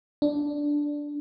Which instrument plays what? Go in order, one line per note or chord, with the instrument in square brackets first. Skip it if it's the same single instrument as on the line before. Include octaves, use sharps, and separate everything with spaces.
[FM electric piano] D4